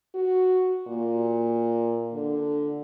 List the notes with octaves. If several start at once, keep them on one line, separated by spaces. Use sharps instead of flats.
F#4
A#2
D3